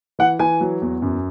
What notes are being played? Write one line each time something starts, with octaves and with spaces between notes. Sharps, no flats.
E3 F#5
E3 G#5
F#3
E2
F#2